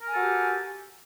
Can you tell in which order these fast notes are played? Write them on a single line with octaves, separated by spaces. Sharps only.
A#4 G#5 A4 F#4 G4